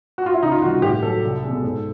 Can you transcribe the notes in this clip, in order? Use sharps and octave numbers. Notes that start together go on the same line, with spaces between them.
F#4
F4
E4
C#2 D#4
F4
C3 D#3 G3 F#4
A2 G4
F#3 A4
C2
B2 G#3
G#2